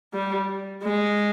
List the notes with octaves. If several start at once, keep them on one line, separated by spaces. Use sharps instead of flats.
G3
G#3